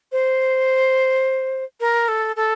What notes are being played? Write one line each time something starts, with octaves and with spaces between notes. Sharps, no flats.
C5
A#4
A4
A4